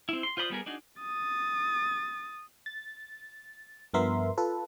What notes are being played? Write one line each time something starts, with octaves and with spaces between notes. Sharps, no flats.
C4 E4
C6
F4 C5 D5 B5 D#6
G3 B3 G#4 A#4
D4 D#4 F#4 G#4
D#6 A6
A6
G2 F3 B3 A#4 E5 C6
F4 A4 B4